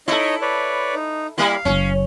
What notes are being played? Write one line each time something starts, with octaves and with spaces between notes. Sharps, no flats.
D#4 E4 A4 C#5 D#5
B4 C#5 D5
D#4
G3 A#3 E4 F5
F#1 F#3 C#4